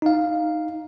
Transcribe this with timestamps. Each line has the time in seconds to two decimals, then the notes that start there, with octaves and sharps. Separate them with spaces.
0.02 D#4 F5